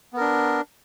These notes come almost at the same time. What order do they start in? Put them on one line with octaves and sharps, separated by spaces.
B3 A#4 D4